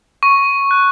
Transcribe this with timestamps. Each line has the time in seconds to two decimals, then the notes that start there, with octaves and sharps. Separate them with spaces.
0.23 C#6
0.71 F#6